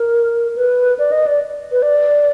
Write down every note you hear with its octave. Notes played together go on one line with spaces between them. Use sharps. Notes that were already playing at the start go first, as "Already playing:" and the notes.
Already playing: A#4
B4
D5
D#5
D5
B4
D5